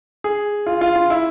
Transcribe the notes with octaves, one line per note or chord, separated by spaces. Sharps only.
G#4
F4
F4
F4
E4